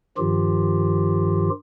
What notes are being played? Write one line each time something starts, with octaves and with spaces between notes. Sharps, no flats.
G2 D#3 F3 F4 G4